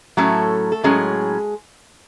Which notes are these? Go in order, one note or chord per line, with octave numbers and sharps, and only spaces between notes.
A2 F#3 A3 C#4 A4
A4
A2 F#3 G#3 C#4 G#4